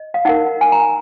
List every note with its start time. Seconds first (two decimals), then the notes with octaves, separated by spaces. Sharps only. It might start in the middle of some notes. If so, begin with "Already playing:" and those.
Already playing: D#5
0.14 F5
0.25 D#4 A#4 F#5
0.61 G#5
0.72 A#5